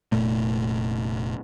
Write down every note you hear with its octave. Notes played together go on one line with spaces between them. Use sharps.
F1 A#2 A3